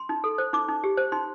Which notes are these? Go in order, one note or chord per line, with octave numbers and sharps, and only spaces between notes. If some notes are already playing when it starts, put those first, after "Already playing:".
Already playing: C6
D#4
A4
C5
D#4 D6
D#4
G4
C5
D#4 C6